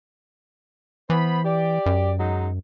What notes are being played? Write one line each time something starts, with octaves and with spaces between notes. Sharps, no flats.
E3 B3 C5 B5
G4 D5
F#2
F#3 G#3 D#4